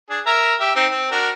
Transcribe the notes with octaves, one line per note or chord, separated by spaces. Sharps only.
D4 G#4
A#4 E5 A#5
G4 E5
C4 D#4
C4
D4 F#4 A#4